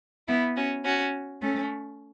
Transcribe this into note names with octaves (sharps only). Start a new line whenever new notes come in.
B3 E4
C#4 F#4
C#4 F#4
A3 C#4